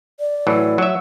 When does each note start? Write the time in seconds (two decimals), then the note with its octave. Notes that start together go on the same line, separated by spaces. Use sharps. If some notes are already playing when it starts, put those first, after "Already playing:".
0.20 D5
0.47 A2 E3 F#3
0.78 F#3 E5